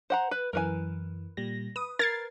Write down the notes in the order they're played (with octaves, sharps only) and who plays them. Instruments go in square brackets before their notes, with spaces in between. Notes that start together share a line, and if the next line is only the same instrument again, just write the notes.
[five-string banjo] C5 F#5 A#5
B4
[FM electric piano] F#2 E3 [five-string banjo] A#4 B4 G#5
[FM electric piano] A#2 G3 A#6
[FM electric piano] B4 [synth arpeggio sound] D#6
[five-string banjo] A#4 [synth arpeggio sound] G#6 A6 C7